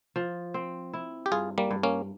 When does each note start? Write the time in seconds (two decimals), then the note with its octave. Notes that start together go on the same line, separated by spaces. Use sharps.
0.16 F3
0.54 C4
0.93 E4
1.26 G4
1.31 G2 F4 G#4
1.58 G3 A#3
1.71 G2
1.83 A#3 C#4